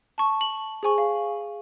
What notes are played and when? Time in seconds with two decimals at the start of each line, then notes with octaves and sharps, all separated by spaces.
0.18 A5 C#6
0.41 F#7
0.83 G#4 C5 G#5 C#6
0.98 F5